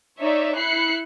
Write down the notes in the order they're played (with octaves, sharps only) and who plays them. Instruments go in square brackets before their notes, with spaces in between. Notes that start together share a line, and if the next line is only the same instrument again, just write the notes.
[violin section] D#4 C#5 D5 E5
E4 F#6 C7 C#7